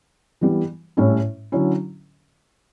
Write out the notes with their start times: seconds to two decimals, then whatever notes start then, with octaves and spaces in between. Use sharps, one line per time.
0.41 E3 G3 B3
0.97 A2 G3 C#4 E4
1.52 D3 F#3 C#4 E4